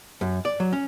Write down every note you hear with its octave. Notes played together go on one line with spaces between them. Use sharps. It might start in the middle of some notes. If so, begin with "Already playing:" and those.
F#2
D5
F#3
C#4